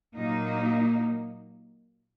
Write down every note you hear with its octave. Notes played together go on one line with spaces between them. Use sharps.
A#2 F#3 A#3 D#4